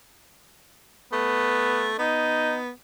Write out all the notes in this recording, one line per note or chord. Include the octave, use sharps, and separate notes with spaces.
A3 B3
B3 D#4